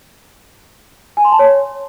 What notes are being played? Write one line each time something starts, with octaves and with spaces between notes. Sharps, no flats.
G#5
C6
A5
C#5